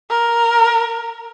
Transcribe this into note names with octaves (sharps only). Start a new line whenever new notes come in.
A#4